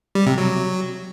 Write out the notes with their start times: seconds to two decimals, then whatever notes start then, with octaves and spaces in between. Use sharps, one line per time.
0.15 G3
0.27 C3
0.38 F#3